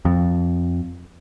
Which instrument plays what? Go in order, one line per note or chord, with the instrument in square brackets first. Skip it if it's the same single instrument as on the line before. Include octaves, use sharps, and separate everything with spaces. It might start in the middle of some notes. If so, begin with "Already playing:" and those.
[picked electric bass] F2